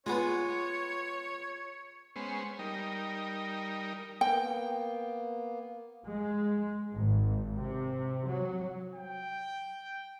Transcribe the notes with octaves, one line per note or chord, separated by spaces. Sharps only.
G#3 B3 F4 C#5 G#5
G#3 B3 C#4 C5
G3 D#4 A#4
A#3 B3 G5
G#3
G#1
C3
F#3
G5